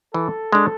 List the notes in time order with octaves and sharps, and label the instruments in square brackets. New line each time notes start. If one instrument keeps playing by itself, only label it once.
[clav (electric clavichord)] E3 [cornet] A4
[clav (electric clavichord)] G#3 D4